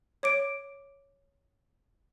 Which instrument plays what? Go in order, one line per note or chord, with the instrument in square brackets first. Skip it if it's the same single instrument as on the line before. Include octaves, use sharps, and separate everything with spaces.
[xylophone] C#5 D6 D7